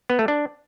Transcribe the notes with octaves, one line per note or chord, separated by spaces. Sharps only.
B3
A3
D4